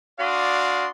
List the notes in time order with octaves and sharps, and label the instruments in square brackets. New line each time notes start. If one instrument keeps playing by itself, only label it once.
[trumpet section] D4 F#4 D5 F5 C6 D#6